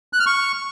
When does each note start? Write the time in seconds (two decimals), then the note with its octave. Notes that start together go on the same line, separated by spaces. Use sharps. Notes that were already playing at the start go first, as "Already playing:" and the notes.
0.13 F#6
0.20 F6
0.26 C#6